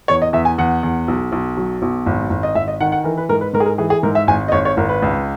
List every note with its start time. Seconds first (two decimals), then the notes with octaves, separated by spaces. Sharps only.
0.08 E2 C#5
0.22 D#5
0.33 E2 E5
0.45 G#5
0.58 E2 F#5
0.83 E2
1.08 B1
1.32 B1
1.57 F#3
1.82 B1
2.06 G#1
2.30 G#1
2.43 D#5
2.55 G#1 E5
2.68 D#5
2.81 D#3 F#5
2.92 F#5
3.04 E3 A#4
3.17 B4
3.29 G#2 A#4
3.41 B4
3.53 G#2 A#4
3.60 G#4
3.66 A#4
3.78 E3 G#4
3.90 G#4
4.03 G#2 A#4
4.15 E5
4.27 G#1 G#5
4.48 D#5
4.52 G#1 C#5
4.65 C#5
4.77 G#1 A#4
4.89 B4
5.02 C#2